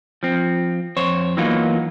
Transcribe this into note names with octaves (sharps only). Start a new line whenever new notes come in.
F3 C4
F2 C5 C#5
E3 F#3 A#3 B3 D#4 F4